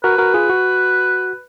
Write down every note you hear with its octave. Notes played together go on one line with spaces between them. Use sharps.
F#4 A#4 B4
F#4 A#4
F4 G#4
F#4